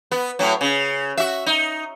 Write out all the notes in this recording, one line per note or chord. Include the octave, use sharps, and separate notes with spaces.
B3
A2 F#3
C#3
F#4 E5
D#4